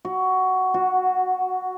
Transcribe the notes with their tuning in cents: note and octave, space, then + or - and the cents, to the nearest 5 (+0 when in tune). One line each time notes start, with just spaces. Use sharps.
F#4 +10
F#4 -10